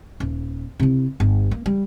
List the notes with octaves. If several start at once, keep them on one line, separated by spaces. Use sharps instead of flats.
D#1
C3 E4
G1
A#3
G3